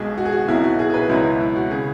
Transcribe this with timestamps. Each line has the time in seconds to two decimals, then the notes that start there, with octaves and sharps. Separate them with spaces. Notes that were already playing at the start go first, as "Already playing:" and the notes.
Already playing: B1 B2 G#3 G#4
0.18 F#4
0.25 G#4
0.33 F#4
0.48 B1 B2 F#3 E4
0.64 F#4
0.79 G#4
0.90 G#4
0.94 B4
1.09 C#2 B2 F#3 E4
1.40 E4
1.56 F#4
1.71 C#3 G#4